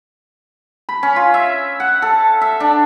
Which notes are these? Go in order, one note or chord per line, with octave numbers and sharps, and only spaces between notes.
B5
C#4
F4
E5
F#5
A4
E5
D4